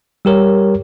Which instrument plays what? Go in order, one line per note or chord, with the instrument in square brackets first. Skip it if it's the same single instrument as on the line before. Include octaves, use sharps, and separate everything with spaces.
[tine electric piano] G3 G4 A#4 C#5